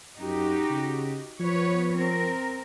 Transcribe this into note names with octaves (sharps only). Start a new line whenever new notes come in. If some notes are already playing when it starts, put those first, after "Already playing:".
F#2 D#4 F#4 G4
C#3
F3 B3 B4 C#5
C4 A#4